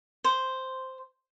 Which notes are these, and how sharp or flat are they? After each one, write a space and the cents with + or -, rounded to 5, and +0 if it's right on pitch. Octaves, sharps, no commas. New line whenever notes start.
C5 -5